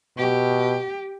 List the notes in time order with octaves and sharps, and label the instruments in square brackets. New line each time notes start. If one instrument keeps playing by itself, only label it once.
[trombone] B2 [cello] G4